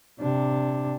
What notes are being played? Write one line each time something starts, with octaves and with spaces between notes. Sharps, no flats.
C3 D4